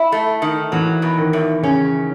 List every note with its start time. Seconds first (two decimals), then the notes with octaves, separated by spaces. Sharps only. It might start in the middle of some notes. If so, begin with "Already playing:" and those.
Already playing: E4
0.12 A3
0.42 D#3
0.72 E3 F#3
1.02 B2
1.18 D#3
1.33 E2
1.63 C#3 C#4